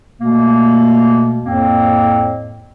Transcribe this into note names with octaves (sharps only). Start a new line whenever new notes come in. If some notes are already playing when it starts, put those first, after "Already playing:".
B2 A3 A#3
F2 A2 A#3 C4